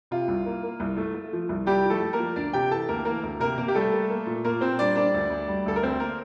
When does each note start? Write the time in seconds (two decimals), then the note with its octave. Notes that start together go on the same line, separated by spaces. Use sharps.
0.11 C3 F4
0.28 C2
0.46 A#3
0.63 A#3
0.80 C2
0.97 A3
1.14 A3
1.33 F3
1.49 C2
1.66 C2 G3 G4
1.85 F3
1.90 A3 A4
2.02 A3
2.13 A#3 A#4
2.19 F3
2.36 D2 D4 D5
2.53 C3 G4 G5
2.71 E3 A4 A5
2.88 D2 A#3 A#4
3.05 E3 A#3 A#4
3.23 D2
3.40 C3 A#3 A#4
3.58 C3 A#3 A#4
3.68 G4
3.74 G3 A3 A4
3.92 A#3
4.10 A#3
4.26 A#2
4.44 A#2 A#3 A#4
4.61 A#2 C4 C5
4.79 G3 D4 D5
4.96 A#3 D4 D5
5.14 D2
5.30 D2
5.48 G3
5.66 D2 A4
5.76 A#4
5.82 D2 C4 C5
6.00 A#3 A#4